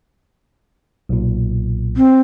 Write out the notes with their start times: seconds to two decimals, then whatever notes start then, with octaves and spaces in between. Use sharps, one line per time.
1.09 B1 A#2
1.97 C4